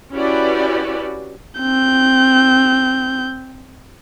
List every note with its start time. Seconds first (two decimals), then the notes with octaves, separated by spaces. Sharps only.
0.13 C#4 E4 F#4 G4 B4 D5
1.61 C4 G6